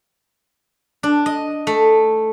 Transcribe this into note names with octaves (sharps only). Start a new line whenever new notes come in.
D4
D#5
A3